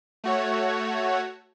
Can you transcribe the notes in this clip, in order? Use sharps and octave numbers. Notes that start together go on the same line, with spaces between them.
A3 F#4 C#5